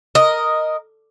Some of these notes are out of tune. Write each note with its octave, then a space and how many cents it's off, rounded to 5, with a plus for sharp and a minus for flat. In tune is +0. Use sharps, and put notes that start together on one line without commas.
A#4 +0 D#5 +0